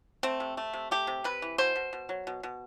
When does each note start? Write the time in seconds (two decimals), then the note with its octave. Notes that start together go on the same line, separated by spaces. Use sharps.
0.23 A3 C4
0.40 C3
0.57 A3
0.74 C3
0.91 A3 G4
1.07 C3
1.24 C3 B4
1.42 E3
1.58 B2 C5
1.76 B2
1.93 B2
2.09 F#3
2.27 B2
2.43 B2